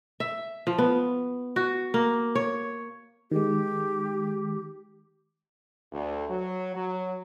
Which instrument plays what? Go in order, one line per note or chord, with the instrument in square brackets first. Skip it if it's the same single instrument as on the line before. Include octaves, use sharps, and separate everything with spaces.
[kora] E5
F3
B3
F#4
A#3
C#5
[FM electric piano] D#3 G#3 [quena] G4
[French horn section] D2
F#3
F#3